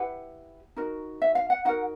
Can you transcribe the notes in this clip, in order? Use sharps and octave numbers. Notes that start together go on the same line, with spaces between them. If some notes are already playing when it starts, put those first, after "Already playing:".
Already playing: E4 G4 B4 F#5
D#4 F#4 A#4
E5
F5
F#5
D#4 F#4 A#4 F#5